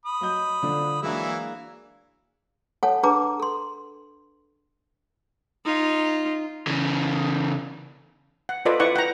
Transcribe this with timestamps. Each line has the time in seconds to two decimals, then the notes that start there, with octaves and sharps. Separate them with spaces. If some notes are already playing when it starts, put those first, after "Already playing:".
0.06 B5 D#6
0.21 F#3 D#5 G6
0.62 D3 F3 D4
1.02 E3 F#3 G#3 A#3 D4 E4
2.83 A4 C#5 F#5 G#5 A5
3.03 D4 G#4 B4 A5 A#5 D6
3.40 A4 C6
5.65 D#4 F4
6.67 C#3 E3
8.49 F#5
8.65 F4 A4 B4 C5 D5 D#5
8.80 E4 B4 D5 F#5 C#6
8.96 F#5 G5 A#5